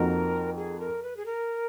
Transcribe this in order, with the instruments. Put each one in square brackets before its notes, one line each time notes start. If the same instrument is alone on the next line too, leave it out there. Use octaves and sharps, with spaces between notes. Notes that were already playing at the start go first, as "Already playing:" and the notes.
Already playing: [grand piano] F2 F3 A#3 D#4 F#4 [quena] A#4
[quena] G#4
A#4
B4
G#4
A#4